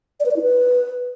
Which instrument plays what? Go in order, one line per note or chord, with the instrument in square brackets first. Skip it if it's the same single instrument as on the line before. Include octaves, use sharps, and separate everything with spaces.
[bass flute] D5
B4
D5
E4
B4